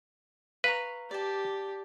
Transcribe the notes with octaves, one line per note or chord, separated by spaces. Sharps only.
B4 F5 A#5 C#6
G4 D5 A5